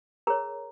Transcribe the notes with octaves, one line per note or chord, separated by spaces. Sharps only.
G#4 A#4 C#5 A#5